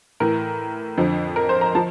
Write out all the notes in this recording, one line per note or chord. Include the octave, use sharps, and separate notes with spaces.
A2 E3 A#4
F2 D3 F3
A#4
C5
A#5
F3 A5